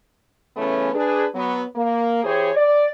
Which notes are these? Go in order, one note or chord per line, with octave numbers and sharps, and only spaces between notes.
C#3 E3 A3 B3 C#4
D4 G#4 B4
F#3 B3
A#3
E3 G4 G#4 C5 C#5
D5